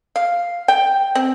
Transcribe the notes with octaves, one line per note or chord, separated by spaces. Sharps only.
F5
G5
C4